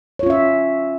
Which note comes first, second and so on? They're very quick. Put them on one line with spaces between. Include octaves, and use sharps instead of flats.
C#5 F4 C#4 E5